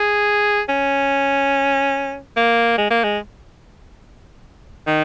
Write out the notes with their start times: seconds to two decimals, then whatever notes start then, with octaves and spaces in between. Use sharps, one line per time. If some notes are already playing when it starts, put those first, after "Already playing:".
Already playing: G#4
0.69 C#4
2.37 A#3
2.78 G#3
2.91 A#3
3.04 G#3
4.87 D#3